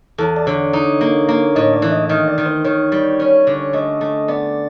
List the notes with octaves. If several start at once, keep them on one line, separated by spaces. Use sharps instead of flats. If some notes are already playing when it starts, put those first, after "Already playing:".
E2 A4
D5
D3 C#5
D#4
A#3
A#3
A2 D#5
D5
E3
D#5
D#3 D#5
D5
D#3
C5
D#3 C#5
G3
C#4
D3
A3 D#5
A3
B3 D5